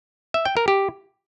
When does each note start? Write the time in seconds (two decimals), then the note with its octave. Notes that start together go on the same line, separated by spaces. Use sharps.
0.34 E5
0.45 G5
0.57 A#4
0.68 G4